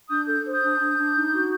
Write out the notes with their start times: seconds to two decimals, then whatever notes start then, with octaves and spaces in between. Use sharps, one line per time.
0.08 D4 D#6 G6
0.26 A4 G6
0.44 C5
0.51 D#6 G6
0.61 D4
0.78 D4
0.96 D4
1.14 D#4
1.31 F#4